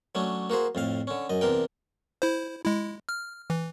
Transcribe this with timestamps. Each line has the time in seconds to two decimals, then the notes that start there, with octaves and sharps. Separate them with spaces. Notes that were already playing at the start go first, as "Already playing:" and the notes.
0.15 F#3 A3 C#4 D4
0.50 A#3 F#4 G#4 C5
0.75 F2 A2 F5
1.07 D3 C#4
1.30 F#2 D#5
1.41 E2 C3 D4 A#4 G5
2.22 E4 C5
2.64 G#3 E4
3.09 F6
3.50 E3